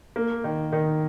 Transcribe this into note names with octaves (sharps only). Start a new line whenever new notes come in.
A#3
D#3
D#3